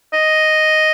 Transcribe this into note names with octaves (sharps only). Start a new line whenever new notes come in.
D#5